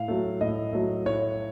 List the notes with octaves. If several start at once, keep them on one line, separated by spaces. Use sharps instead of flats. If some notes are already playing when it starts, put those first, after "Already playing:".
Already playing: A2 F5
F#3 A3
A2 D#5
F#3 A3
A2 C#5